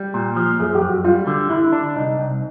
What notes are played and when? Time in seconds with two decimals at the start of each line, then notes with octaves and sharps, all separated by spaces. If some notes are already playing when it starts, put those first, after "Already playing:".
Already playing: G3
0.14 A#2
0.36 F3
0.60 F#2 G#4
0.75 G4
0.82 F#2
0.89 F#4
1.04 G3 F4
1.27 D3
1.50 D3 E4
1.72 D4
1.96 C2 D#4
2.18 C2